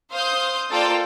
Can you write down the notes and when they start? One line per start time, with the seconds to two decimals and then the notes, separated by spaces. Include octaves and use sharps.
0.11 C5 F5 C6 D#6 G6
0.71 A#3 F4 A4 C5 D5 G5